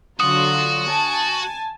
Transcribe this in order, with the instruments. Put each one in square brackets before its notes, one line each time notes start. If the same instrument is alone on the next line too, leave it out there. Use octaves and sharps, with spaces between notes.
[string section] D3 F#3 F4 [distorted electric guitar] F#4 [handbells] D#6
[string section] G#5 A5